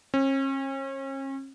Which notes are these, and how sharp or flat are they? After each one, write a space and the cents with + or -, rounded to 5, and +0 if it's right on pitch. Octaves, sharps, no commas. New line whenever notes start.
C#4 -40